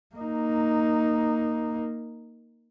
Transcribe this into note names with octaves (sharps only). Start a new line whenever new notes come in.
A#3 D#4